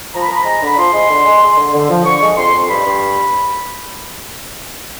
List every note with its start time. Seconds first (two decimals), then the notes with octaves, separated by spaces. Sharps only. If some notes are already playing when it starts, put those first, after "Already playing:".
0.14 F3 A#5
0.20 B5
0.28 F3 A#5
0.35 B5
0.42 G#3 A#5
0.61 D3 B5
0.77 F3 C6
0.93 G#3
1.09 D3
1.25 G#3
1.42 G#3
1.57 D3
1.73 D3
1.90 F3
2.05 D3 C#6
2.21 G#3
2.36 F2 C6
2.53 F2
2.69 G2 B5
2.85 G2